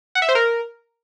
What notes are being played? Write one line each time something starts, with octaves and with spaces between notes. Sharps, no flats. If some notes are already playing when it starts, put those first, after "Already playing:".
F#5
E5
C5
A#4